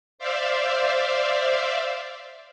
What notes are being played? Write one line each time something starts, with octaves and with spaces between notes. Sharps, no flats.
C5 D5 E5 F5